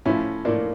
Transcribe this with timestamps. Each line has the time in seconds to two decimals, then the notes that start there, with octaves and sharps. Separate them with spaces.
0.05 A2 F3 C#4 E4
0.45 A2 F3 A#3 D4